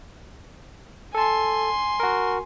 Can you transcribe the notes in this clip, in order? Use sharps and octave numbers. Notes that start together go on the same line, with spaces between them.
A4 G#5 A5 C6
F#4 A#4